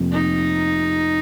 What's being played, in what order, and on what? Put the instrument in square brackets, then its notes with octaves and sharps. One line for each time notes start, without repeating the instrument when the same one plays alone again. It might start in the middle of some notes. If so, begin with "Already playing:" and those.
Already playing: [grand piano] F1 F2 C3 F3 A#3
[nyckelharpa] D#4